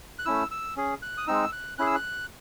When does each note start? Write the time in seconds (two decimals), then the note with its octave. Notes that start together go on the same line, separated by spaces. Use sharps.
0.19 F#6
0.25 A3 C#4 E4 E6
0.51 E6
0.76 C#4 G#4
1.02 F#6
1.18 D#6
1.27 G#3 C4 D#4 E6
1.52 F#6
1.78 C#4 E4 G#4 F#6
1.87 E6
1.95 F#6